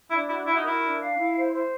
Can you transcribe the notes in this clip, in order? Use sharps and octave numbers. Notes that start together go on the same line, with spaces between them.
D4 E4
E4 F#4
E4 F#4
D#4
E4 A#4
D4
F5
E4
C5
C5